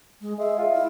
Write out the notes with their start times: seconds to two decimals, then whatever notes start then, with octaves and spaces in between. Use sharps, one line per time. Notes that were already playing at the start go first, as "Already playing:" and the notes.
0.21 G#3
0.38 G#3 E5
0.58 F4
0.74 E4